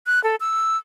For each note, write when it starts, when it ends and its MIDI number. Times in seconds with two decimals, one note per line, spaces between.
0.07 0.22 90
0.24 0.36 69
0.40 0.77 88